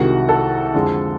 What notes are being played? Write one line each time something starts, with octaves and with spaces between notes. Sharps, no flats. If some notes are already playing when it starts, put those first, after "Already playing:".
Already playing: C2 C3 D#3 G#3 F#4 F#5
A4 A5
F2 D3 F3 G#3